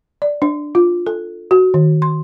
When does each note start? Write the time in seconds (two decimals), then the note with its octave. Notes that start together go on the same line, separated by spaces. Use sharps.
0.22 D5
0.42 D4
0.75 F4
1.07 A4
1.51 F#4
1.74 D#3
2.02 C6